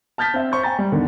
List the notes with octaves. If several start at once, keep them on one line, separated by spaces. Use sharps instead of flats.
A5 F6 G6 A6 B6
C4 E5
C5 C#6 G6
G5 G#5 A#5 A6
G3
E2 D3 D#3